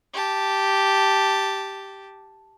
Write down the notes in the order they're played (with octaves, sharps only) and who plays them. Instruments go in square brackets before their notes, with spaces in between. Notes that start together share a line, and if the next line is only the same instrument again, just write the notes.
[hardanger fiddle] G4 A5